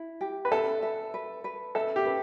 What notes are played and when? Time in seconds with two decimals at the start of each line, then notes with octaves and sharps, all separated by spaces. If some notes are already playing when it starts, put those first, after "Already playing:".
Already playing: E4
0.21 G4
0.45 B4
0.51 A4 E5
0.83 E5
1.14 B4
1.44 B4
1.75 A4 E5
1.96 G4
2.06 B4